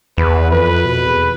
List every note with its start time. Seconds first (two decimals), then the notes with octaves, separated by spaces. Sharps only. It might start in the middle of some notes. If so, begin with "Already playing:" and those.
0.18 E2 B4
0.51 F2 B4
0.85 B2
1.07 E2